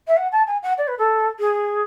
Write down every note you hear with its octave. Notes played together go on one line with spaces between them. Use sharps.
E5
F#5
A5
G#5
F#5
D5
B4
A4
G#4